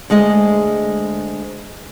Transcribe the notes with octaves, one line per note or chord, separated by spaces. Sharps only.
D2 G#3 G#4 D#5